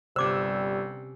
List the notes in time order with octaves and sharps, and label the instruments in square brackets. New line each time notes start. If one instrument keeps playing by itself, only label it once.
[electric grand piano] G1 E6 [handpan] C3 C#4 [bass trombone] G3 [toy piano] C5 D6